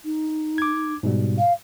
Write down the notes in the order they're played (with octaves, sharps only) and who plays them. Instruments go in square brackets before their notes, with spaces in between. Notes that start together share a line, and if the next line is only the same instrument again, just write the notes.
[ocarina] D#4
[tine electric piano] D6 G#6
G#2 B2 G3
[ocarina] F5